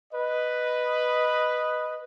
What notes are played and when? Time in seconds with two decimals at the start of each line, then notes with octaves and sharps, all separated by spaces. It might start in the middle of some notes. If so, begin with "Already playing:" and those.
0.13 B4 D#5